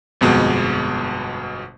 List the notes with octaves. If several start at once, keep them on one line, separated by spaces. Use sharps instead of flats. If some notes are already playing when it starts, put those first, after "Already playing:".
G1 F2 B2 G#3